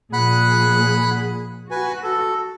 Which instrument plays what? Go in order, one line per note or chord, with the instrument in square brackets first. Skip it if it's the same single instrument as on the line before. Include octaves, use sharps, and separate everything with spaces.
[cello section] A#2 F3 G#4 [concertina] F#5 B5 F#6
[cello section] F#4 [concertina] B4 G#5
[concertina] A4